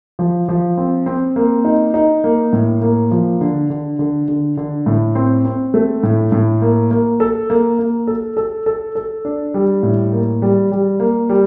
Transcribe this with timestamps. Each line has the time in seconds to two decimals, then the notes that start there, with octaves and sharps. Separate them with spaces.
0.19 F3
0.49 F3
0.77 C4
1.06 C4
1.36 A#3
1.65 D#4
1.94 D#4
2.24 A#3
2.53 A2
2.82 A#3
3.11 F3
3.41 D3
3.70 D3
3.99 D3
4.28 D3
4.57 D3
4.86 A2
5.15 C4
5.45 C4
5.74 A3
6.03 A2
6.32 A2
6.62 A#3
6.91 A#3
7.20 A4
7.50 A#3
7.79 A#3
8.07 A4
8.37 A4
8.66 A4
8.95 A4
9.25 D4
9.54 G3
9.83 A2
10.12 A#3
10.42 G3
10.72 G3
11.00 A#3
11.29 G3